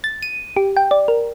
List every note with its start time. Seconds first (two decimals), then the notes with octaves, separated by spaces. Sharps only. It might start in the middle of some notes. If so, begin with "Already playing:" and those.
0.04 A6
0.22 D#7
0.56 G4
0.77 G5
0.91 D5
1.08 A#4